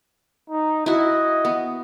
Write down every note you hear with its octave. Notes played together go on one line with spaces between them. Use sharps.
D#4
E4 F#4 D#5
B3